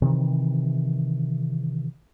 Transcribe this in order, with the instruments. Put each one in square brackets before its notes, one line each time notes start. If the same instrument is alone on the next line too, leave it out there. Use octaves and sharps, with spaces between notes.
[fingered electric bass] C3 D#3 E3